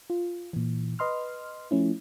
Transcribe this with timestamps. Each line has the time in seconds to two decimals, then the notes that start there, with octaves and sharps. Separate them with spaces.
0.10 F4
0.53 A#2 E3
0.99 B4 D#5 C6 F6
1.71 F3 A3 C#4 E4